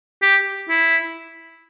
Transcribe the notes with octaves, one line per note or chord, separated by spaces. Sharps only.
G4
E4